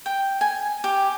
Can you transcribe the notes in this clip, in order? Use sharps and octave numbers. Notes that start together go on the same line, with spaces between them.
G5
G#5
G4